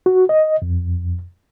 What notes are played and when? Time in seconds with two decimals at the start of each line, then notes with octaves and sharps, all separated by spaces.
0.06 F#4
0.29 D#5
0.62 F2